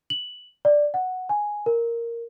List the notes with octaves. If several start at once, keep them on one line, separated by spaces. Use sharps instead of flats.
F#7
D5
F#5
G#5
A#4